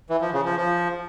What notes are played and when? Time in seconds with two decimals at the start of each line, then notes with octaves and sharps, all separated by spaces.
0.09 E3
0.21 F3
0.33 C#3
0.45 F3
0.57 F3